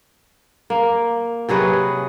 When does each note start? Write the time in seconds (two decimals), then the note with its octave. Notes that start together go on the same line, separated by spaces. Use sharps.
0.70 A#3
1.49 C3 F#3 G#4 B4